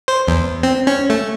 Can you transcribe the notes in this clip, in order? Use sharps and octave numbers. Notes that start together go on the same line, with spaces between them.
C5
E2
C4
C#4
A3